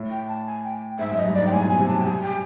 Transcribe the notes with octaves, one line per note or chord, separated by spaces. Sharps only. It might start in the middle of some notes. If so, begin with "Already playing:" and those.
Already playing: A2
G5
A5
G#5
G5
G#2 E5
F#2
D#5
G2
G#2 D5
G5
A2 G#5
B2 G#5
C3
F#3 A5
G5
G3 G#5
G5